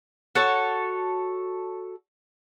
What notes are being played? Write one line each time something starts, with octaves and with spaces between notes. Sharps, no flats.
F#4 A4 C#5